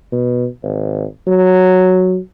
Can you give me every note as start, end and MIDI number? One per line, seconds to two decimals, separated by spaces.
0.12 0.46 47
0.63 1.04 32
1.27 2.18 54